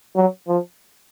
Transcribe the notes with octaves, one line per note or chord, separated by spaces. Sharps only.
F#3
F3